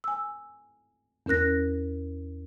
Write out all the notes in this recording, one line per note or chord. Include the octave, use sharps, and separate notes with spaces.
G#5 E6
E2 C#4 A#4 F#6 A#6